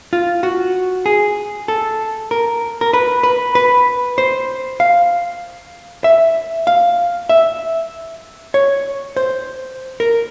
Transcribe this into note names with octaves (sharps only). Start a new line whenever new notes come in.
F4
F#4
G#4
A4
A#4
A#4
B4
B4
B4
C5
F5
E5
F5
E5
C#5
C5
A#4